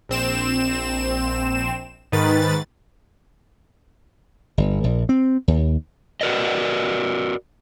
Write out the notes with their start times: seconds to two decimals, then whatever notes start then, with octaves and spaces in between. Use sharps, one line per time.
0.09 A#1 C4 E7
2.12 G#2 D#3 B4 A6
4.58 G1
4.84 A#1
5.09 C4
5.48 D#2
6.21 F#4 A#4 B4 D5 D#5